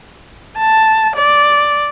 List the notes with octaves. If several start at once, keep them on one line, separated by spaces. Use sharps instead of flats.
A5
D5